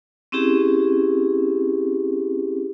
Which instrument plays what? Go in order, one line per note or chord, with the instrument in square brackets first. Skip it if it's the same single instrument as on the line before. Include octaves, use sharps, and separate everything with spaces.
[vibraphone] C4 C#4 E4 G4 G#4